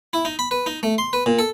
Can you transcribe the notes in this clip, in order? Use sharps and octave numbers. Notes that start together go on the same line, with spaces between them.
E4
D#4
B5
B4
D#4
A3
C6
B4
A#2
A4